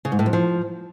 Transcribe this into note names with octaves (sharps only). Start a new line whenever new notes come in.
C#3
G#2
A2
F2
F3